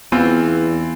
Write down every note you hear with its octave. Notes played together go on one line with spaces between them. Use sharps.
E2 E3 B3 C4 F4